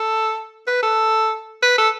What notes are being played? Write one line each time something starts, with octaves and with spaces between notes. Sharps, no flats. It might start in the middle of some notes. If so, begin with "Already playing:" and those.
Already playing: A4
B4
A4
B4
A4